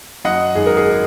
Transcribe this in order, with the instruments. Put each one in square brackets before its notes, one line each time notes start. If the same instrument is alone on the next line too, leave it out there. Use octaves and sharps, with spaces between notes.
[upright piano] F#2 D#5 F#5
G#1 G#4
A#4
G#4